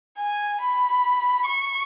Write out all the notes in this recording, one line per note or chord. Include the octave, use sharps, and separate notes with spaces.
G#5
B5
C#6